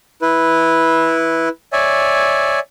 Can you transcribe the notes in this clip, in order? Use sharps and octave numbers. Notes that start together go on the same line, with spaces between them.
E4 B4
C#5 D5 E5 G#5